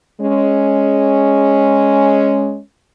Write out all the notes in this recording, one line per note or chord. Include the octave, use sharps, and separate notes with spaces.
G#3 C#4